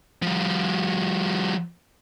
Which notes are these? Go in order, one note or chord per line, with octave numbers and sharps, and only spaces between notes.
F3 G3